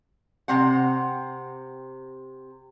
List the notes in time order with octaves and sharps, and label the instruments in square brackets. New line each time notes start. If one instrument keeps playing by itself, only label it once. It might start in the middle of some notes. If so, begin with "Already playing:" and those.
[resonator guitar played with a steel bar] C3 C4 F#5